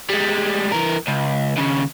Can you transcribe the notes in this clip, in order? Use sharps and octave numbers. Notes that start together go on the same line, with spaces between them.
G3 G#3
E3 A#4
C#2
D#2 C#3